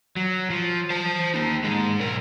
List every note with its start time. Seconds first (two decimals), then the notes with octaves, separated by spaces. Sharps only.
0.16 F#3
0.50 F3
0.90 C5 A5
1.34 A#3 D#4
1.64 G#3 D#4
2.00 B1 A#4